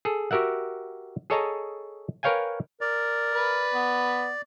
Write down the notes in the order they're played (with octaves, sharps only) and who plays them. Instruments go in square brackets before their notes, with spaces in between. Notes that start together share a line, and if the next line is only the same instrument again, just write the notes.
[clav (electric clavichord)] G#4 A4
F#4 G4 A#4 E5 F#5
G#4 A4 C#5 D#5 A5 A#5
A#4 B4 C#5 F5 G5 G#5
[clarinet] A#4 [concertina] D5
[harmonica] B4
[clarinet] B3